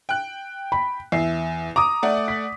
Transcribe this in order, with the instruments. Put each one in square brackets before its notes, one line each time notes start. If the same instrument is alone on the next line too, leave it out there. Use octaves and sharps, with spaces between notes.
[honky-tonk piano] G5 F#6
[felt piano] B5
[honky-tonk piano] E2 [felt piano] E5 C7
[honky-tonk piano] A#5 [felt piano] D6 D#6
[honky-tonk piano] A3 D5 F#5
[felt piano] B6